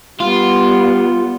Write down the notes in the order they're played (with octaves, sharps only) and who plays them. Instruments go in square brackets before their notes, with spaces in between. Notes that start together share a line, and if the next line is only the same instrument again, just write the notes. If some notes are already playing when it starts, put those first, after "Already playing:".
[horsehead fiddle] G3 B3 [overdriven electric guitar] F4